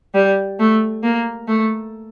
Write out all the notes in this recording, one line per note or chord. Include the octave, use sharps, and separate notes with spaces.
G3
A3
A#3
A3